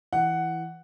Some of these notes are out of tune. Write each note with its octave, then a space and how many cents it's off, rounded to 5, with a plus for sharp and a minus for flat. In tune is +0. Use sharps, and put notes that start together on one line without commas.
E3 +0 F#5 +5